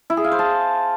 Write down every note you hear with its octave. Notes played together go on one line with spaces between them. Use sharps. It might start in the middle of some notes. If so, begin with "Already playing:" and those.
E4
G#4
F5
C5
A5